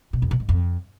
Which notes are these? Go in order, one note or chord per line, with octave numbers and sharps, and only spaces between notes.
B2
F2
B2
G#2
F2